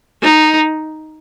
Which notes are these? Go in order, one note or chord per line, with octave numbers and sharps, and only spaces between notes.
D#4